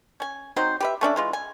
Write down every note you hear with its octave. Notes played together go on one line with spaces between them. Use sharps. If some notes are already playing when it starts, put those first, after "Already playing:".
C#4 G#5
F#3 C4 D#4 C5
G4 B4 E5
A3 C#4 D4 E5
E3 G#3 F4
G#5